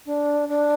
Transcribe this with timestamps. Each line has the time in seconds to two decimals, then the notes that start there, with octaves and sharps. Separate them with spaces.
0.05 D4
0.48 D4